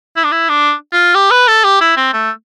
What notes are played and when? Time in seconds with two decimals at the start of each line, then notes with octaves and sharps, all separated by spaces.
0.17 E4
0.24 D4
0.31 E4
0.49 D4
0.93 F4
1.15 G4
1.31 B4
1.48 A4
1.64 G4
1.81 E4
1.97 C4
2.13 A3